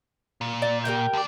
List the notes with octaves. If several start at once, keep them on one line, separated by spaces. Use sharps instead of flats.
A#2
D5
G4 A#4 G5
D2 D5